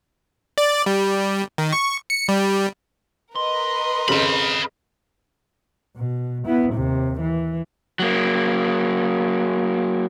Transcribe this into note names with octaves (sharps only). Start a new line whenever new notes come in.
D5
G3
D#3
C#6
C#7
G3
A#4 B4 D#5 C6
F2 C#3 G#4 B5
B2
B3 E4
D#2 C3
E3
F#3 A#3